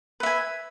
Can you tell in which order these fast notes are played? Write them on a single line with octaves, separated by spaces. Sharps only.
B4 E5 G#5